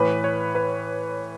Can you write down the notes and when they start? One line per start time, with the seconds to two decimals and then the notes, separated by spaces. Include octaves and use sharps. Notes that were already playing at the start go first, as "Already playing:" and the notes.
Already playing: A2 E3 B4
0.24 C#5
0.55 B4